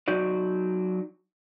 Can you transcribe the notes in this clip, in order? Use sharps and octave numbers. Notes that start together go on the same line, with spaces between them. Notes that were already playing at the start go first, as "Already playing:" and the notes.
F#3 D#4 F#4 D5